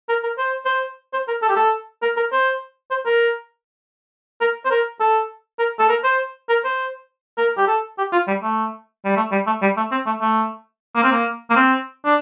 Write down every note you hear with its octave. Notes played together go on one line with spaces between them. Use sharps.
A#4
A#4
C5
C5
C5
A#4
A4
G4
A4
A#4
A#4
C5
C5
A#4
A#4
C5
A#4
A4
A#4
A4
A#4
C5
A#4
C5
A#4
G4
A4
G4
F4
G3
A3
G3
A3
G3
A3
G3
A3
C4
A3
A3
A#3
C4
A#3
A#3
C4
D4